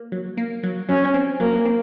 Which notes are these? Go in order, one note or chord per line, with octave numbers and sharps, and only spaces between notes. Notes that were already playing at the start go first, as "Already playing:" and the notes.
Already playing: A#3
F#3
A#3
F#3
F#3 C#4
C4
F#3 A#3
C4